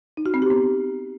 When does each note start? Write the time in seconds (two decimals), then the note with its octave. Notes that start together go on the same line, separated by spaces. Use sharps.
0.17 D#4
0.26 F#4
0.34 C4
0.42 G4
0.50 B3